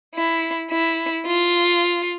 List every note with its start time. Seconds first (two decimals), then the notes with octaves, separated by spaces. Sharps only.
0.15 E4
0.71 E4
1.27 F4